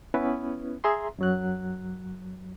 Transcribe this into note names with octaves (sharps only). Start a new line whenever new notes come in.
B3 C#4 E4 B4
G#4 E5 A#5 C6
F#2 F#3 F#6